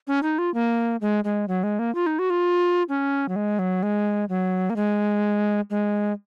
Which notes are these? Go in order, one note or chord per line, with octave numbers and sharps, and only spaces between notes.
C#4
D#4
F4
A#3
G#3
G#3
F#3
G#3
A#3
F4
D#4
F#4
F4
C#4
F#3
G#3
F#3
G#3
F#3
A#3
G#3
G#3